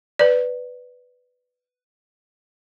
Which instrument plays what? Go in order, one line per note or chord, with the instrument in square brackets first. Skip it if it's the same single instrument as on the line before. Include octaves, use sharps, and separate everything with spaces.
[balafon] B4 D5